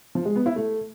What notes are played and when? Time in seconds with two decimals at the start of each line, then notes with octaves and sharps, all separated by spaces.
0.15 F3
0.25 G#3
0.36 B3
0.46 E4
0.56 A3